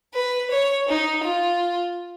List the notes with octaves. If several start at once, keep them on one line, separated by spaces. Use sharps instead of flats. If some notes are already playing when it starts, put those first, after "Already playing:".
B4
C#5
D#4
F4